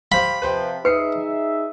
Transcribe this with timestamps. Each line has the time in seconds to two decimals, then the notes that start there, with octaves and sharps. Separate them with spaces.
0.12 G4 C5 F5 B5
0.42 C3 F3 B4 C5 G5
0.85 D#4 G#4 B4 E5 D#6 C7 C#7